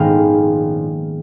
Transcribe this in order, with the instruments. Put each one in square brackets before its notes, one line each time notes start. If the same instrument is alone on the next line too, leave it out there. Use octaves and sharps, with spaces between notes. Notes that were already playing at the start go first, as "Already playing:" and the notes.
Already playing: [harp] A#1 G#2 D#3 G#3 B3 C#4 F5 G5